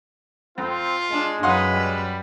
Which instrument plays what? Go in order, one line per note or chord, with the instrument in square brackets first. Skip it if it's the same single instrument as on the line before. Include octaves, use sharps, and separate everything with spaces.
[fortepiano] F2 [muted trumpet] C4 [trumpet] F4
[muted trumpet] G#3 [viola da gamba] D4
[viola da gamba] F#2 B4 [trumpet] D#4 [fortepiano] F5 F#5 C6
[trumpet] G3